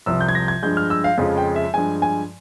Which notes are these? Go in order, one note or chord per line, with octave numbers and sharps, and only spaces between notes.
C2 C3 F3 E6
G6
G#6
A#6
G#6
G2 F3 G#3 G6
F6
E6
F5
F2 C#3 F3 G#3 F5
G5
E5
G2 F3 G#3 G#5
G#5